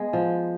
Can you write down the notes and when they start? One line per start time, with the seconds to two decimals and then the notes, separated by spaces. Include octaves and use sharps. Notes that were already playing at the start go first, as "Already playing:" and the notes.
Already playing: G#3 B3
0.13 F3